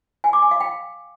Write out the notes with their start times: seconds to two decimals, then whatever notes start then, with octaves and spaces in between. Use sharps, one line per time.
0.24 G#5
0.33 D6
0.42 G#5
0.51 F5
0.60 G5